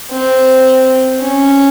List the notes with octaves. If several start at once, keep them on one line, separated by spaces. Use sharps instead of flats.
C4
C#4